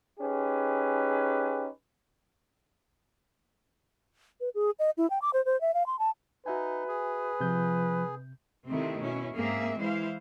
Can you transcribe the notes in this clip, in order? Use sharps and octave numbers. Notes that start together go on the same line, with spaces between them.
C#4 D#4 G4 G#4 B4
B4
G#4
D#5
E4
G5
D6
C5
C5
E5
F5
C6
A5
D#4 F#4 B4 E5 G#5
G#4
C3 F3 G6
C3 D#3 A3 C4 E4
B2 C#4 E4
G#2 A#3 C4 G#4 E5
E3 G#3 E4 C5 F5